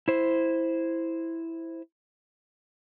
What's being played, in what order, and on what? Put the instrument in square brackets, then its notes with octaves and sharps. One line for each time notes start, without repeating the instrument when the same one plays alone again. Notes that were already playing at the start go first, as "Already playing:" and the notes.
[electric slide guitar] E4 C5